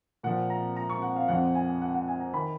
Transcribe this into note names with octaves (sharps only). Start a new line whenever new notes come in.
A#2 F3 F#5
A#5
A#5
C#6
F#5
F5
F2 F3 F#5
G#5
F#5
F#5
G#5
A#5
D#3 B5